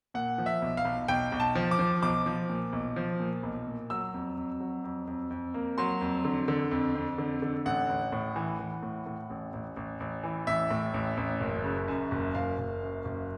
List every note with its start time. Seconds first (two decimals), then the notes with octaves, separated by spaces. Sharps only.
0.14 A#2 F#5
0.38 F3
0.46 E5
0.62 B1
0.77 F5
0.85 B1
1.08 B1 G5
1.32 B1
1.40 A5
1.55 F3
1.71 D6
1.79 F3
2.02 B1 D6
2.26 F3
2.49 A#2
2.73 B1
2.96 F3
3.20 A#2
3.43 B1
3.67 A#2
3.90 F#3 E6
4.14 F2
4.37 F2
4.60 F#3
4.84 F2
5.07 F2
5.30 F2
5.54 A#3
5.78 F#3 C6
6.01 F2
6.25 D3
6.48 D3
6.71 F2
6.95 F2
7.18 D3
7.42 D3
7.65 A1 F#5
7.89 A1
8.13 A2
8.36 E3
8.59 E3
8.83 A2
9.06 A2
9.30 A1
9.53 A1
9.77 A1
10.00 A1
10.24 E3
10.47 A1 E5
10.71 A2
10.94 A1
11.17 A1
11.40 F#1
11.64 C#3
11.88 F#2
12.11 F#1
12.35 F#1 F5
12.58 F#1
12.82 F#2
13.05 F#1